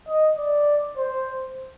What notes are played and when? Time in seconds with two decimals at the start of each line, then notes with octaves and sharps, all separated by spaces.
0.08 D#5
0.38 D5
0.97 C5